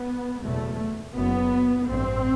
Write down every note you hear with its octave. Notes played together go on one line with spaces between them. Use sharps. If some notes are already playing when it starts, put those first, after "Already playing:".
Already playing: B3
F#1 E2 B2 A3
F#1 F#2 B3
A1 G2 C4